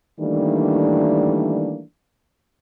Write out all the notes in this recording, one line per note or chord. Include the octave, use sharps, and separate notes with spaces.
D#3 E3 G3 A3 A#3 D4